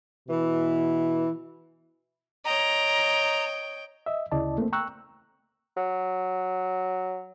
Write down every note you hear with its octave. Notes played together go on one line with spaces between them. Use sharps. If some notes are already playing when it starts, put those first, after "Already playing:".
B2 E3
C#5 D#5 G5 A#5
D#5 E5
D2 C#3 E4 D5 D#5 A5
A3 A#3 C4
G5 A#5 C#6 E6 F#6
F#3